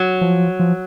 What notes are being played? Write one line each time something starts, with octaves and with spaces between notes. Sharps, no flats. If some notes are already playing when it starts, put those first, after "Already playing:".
Already playing: F#3
F3
F3